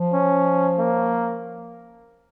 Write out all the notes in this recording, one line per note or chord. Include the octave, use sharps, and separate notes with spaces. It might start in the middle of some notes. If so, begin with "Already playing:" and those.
Already playing: F3
C#4
A#3